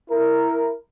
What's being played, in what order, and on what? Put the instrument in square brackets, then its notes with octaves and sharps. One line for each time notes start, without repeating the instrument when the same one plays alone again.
[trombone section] E4 A#4